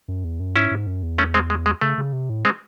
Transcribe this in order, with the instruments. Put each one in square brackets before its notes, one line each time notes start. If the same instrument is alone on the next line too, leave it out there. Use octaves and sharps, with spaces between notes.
[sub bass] F#2
E2
F#2
[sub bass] G#2 [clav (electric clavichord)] C#4 E4
[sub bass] G#2
F#2
E2
[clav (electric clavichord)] A3 C#4
G#3 C4
G#3
G#3
[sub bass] C#3 [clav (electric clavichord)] A3
[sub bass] C#3
C3
A2
[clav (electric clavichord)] G#3 C4